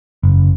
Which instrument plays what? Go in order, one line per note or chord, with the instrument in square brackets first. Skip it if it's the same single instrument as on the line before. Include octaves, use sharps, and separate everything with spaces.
[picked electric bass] F#1